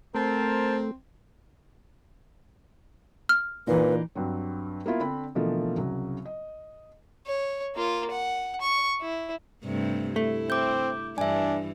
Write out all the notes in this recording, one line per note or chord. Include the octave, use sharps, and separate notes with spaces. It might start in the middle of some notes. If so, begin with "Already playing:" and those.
A3 C4 A#4 C5 A5
F6
A#2 E3 D4 D#4 B4
G2 F#3 C4
A#3 B3 E4 F4
D3 C4 D4 B5
B2 D3 E3 F3 A3 A#3
C2 C#3 F#3
D#5
C#5
A#3 F4
F#5
C#6
E4
G2 C3 A3
A3 E4
C4 D6 G6
G2 E3 D4 E5 G#5